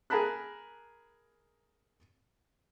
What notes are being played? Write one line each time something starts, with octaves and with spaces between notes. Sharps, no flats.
G#4 A#4 A5 B5 F#6